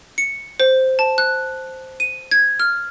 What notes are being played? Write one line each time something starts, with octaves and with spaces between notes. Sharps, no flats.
C#7
C5
A5
F#6
D#7
G#6
F6